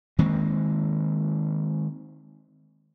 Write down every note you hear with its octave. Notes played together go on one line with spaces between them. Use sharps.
D#3 G#3 A#3 C4